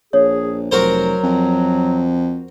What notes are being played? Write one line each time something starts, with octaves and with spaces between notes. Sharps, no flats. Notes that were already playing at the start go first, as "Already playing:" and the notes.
A#1 G#4 C#5
F1 F#3 F#4 A#4 C5
F2